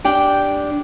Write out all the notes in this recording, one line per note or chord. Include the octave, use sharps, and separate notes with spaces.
D4 G4 G5